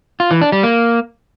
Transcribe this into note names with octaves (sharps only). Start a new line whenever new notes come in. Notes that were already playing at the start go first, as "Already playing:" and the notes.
F4
E3
D4
G3
A#3